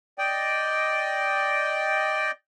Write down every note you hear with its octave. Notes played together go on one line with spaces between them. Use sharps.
D5 D#5 G5